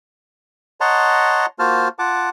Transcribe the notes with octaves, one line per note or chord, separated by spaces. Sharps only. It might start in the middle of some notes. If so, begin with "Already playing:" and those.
C#5 D#5 F#5 A5 A#5 C6
A#3 F4 F#4 C5 A5 F6
F4 F#5 A5 D6